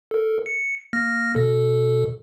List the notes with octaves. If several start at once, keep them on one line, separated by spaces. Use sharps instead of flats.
A4 A#4
C#7
A#3 F6 A#6
B2 A4